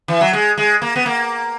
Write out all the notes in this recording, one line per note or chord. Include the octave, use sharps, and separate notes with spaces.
E3
F#3
G#3
G#3
A#3
B3
A#3